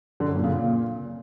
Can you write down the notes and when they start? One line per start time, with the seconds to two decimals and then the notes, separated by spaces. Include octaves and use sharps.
0.20 D3
0.28 F#2
0.36 A#2
0.44 C#3
0.51 A#2